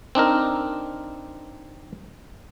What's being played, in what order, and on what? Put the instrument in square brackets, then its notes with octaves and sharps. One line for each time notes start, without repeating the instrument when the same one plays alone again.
[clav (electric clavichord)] C4 D4 D#4 A#4